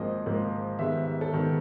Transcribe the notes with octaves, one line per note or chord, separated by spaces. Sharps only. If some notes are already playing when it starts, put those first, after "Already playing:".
Already playing: G#1 G#2 F3 A#3 D#5
G#1 G#2 F3 A#3
G#2 D#3 G3 B3 E5
E5
A4
G#2 D#3 G3 B3 A#4